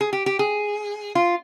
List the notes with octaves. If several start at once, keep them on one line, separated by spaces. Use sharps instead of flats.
G#4
G4
G4
G#4
F4